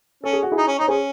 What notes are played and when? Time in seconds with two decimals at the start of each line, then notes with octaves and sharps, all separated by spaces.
0.24 C#4 A4
0.33 G#4
0.43 F#4
0.52 E4 G#4
0.57 D#4
0.67 C#4
0.79 D#4 C#5
0.88 C#4 G#4 C5